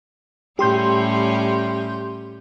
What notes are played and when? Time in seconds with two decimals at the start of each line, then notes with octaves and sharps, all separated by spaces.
0.59 A2 G3 C#4 G4 C6 G6